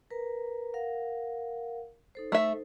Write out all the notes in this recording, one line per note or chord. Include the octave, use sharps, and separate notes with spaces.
A#4 B4 A#5
A#4 F5 F#5
D#4 A4 C5
A3 E5